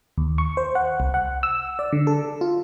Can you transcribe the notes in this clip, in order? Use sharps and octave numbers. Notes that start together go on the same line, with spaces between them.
D#2
C#6
C5
F#5
C2
F#5
E6
D5
D3
A4
F4